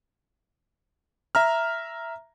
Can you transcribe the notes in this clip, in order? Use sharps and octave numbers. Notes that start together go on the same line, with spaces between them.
E5 A#5 F6